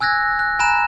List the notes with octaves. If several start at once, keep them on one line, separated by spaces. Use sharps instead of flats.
G#5 E6 F#6 G#6 A#6
F#6
G#5 A#5 B5 F#6 E7